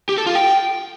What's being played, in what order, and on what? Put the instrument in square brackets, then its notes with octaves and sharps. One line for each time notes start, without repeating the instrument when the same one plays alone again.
[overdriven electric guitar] G4
A4
F4
G5